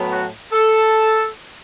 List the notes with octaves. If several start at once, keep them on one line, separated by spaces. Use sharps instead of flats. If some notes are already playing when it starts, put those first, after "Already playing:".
Already playing: A2 F#3 B3
F#4
A4